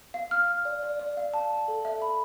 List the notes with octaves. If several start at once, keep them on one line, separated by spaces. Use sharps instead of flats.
F5
F6
F6
D5
D5
D5
F5
A5
A5
A4
E5
B5